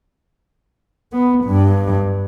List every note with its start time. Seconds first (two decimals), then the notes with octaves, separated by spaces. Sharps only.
1.13 B3
1.45 G2